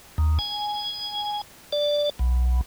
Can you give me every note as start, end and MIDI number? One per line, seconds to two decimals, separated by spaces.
0.18 0.38 39
0.39 1.41 80
1.73 2.10 74
2.19 2.61 35